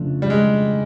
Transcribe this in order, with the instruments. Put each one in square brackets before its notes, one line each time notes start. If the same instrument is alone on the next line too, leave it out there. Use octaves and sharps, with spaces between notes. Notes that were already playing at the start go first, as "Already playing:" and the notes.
Already playing: [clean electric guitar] F2 C#3 F3 A3 D4
[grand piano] G3
G#3